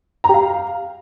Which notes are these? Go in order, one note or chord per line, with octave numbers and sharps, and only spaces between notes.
A#5
G4
F5